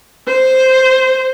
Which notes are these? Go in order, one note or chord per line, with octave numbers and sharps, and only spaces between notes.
C5